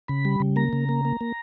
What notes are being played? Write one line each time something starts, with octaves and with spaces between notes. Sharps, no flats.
C#3 B5
G3
C#3
A#3 A#5
C#3
A#3
A#3
A#3